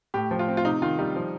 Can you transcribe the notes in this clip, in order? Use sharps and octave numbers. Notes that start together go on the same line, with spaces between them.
A2 G4
F3
F4
C4
F4
C3 D#4
D#3 F4
G3 D#4
F3